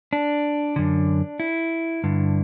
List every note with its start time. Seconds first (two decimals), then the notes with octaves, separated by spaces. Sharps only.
0.13 D4
0.76 F#2 D3
1.40 E4
2.04 G2 D3